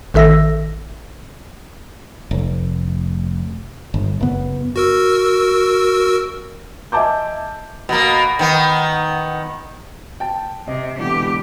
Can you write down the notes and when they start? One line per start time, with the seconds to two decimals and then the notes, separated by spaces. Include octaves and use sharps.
0.14 A1 D#3 A4 E5 E6 A#6
2.31 F1
3.94 G1
4.20 F#1 B3
4.76 F#4 A#4 E6
6.92 D#5 E5 G#5 A5 D6 G6
7.89 B2 A#3
8.39 D#3 B3
10.20 G5 A5
10.68 C3 D#5
10.99 B2 D3 E3 G#3 B3 G4